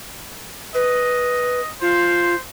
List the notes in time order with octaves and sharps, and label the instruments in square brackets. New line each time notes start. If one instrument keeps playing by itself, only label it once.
[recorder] B4 [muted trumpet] D#5
[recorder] F4 [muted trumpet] C5